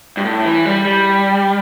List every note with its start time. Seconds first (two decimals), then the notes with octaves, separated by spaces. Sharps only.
0.17 G2
0.24 A2
0.45 E3
0.65 G3
0.85 G3